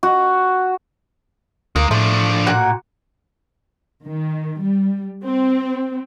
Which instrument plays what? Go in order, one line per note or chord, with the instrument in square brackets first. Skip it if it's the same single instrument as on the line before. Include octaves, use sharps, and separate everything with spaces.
[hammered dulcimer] F#4
[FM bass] D2 [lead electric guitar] G#3 D#4 [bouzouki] A#3
[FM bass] A2 [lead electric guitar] F3 D4 [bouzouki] A3
[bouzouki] A#2 F#4 F#5
[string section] D#3
G3
C4